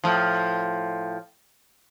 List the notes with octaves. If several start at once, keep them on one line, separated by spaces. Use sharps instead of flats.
A2 F3